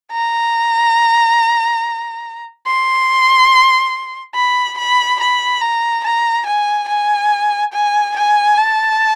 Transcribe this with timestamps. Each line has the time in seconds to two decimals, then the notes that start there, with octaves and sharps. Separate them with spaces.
0.12 A#5
2.66 C6
4.35 B5
4.78 B5
5.20 B5
5.61 A#5
6.04 A#5
6.46 G#5
6.88 G#5
7.73 G#5
8.16 G#5
8.58 A5